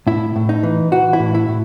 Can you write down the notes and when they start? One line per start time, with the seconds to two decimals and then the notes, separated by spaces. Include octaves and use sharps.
0.07 A2 E4
0.36 A2
0.49 D#4
0.63 E3
0.92 E3 F#4
1.13 E4
1.20 A2
1.35 E4
1.49 A2